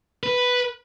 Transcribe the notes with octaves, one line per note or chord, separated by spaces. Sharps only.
B4